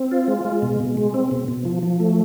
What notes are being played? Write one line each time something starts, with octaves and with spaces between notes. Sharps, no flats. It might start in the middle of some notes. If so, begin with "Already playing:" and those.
Already playing: C4
F4
G#3
G#3
B2
B2
G#3
C4
B2
B2
F3
F3
A3